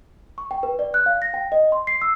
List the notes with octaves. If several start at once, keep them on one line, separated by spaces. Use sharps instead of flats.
C#6
G5
B4
D5
F#6
F5
A#6
G5
D#5
C6
C7
E6